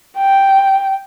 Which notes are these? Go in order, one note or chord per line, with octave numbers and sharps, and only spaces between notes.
G5